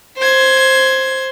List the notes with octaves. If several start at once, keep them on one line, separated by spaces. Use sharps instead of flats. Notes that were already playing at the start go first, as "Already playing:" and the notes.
C5 G#6